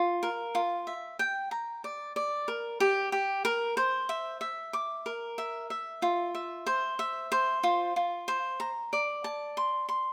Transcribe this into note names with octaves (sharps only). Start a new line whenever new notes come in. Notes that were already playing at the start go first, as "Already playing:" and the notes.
Already playing: F4
A#4
F4
E5
G5
A#5
D5
D5
A#4
G4
G4
A#4
C5
E5
E5
D6
A#4
E5
E5
F4
E5
C5
E5
C5
F4
F4
C5
A#5
D5
A5
C6
C6